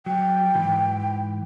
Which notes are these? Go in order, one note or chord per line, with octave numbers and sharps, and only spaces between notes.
F#3 G5
G#2 E3